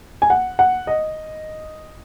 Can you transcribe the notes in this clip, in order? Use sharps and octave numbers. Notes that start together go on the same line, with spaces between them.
G#5
F#5
F#5
D#5